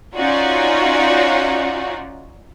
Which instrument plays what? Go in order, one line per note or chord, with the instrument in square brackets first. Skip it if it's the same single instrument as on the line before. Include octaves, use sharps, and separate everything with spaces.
[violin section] C#4 D#4 F4 F#4 D5